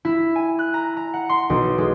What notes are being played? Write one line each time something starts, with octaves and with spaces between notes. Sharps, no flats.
E4
G#5
F#6
A#5
A#5
F#5
C6
B1
G#3